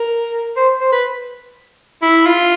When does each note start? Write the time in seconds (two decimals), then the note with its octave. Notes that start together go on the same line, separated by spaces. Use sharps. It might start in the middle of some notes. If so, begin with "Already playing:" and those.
Already playing: A#4
0.56 C5
0.81 C5
0.92 B4
2.02 E4
2.26 F4